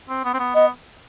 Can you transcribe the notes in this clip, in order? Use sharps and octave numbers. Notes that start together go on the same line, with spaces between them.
C4
B3
C4
B3
B3 D#5